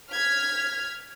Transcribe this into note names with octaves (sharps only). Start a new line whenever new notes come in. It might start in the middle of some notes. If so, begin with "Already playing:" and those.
F6 G#6 B6